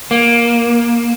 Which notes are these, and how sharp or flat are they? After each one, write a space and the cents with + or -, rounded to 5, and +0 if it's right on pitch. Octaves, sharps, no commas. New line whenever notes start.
A#3 +15